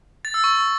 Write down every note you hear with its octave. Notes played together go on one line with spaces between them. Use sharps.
A6
E6
C#6